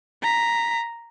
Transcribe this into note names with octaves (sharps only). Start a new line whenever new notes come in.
A#5 B6